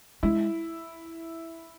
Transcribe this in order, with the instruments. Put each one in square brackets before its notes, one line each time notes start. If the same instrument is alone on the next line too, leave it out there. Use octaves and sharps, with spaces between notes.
[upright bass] G#3 [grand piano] E4